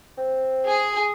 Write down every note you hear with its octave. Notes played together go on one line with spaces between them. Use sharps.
C4
G#4